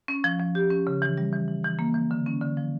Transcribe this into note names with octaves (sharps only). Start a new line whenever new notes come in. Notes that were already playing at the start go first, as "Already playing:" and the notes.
C#4
F3
F3
G4
C#4
C#3
E3
G3
E3
E3
E3
A#3
E3
D3
C#4
D3
F3